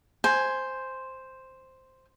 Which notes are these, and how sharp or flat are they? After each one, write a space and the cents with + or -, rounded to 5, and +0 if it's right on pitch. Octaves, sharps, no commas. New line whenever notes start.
C5 +0 G#5 +5